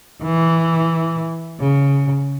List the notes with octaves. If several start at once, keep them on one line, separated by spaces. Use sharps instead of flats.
E3
C#3